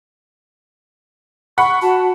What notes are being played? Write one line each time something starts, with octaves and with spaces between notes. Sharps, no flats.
F#5 B5 C#6
F#4 A5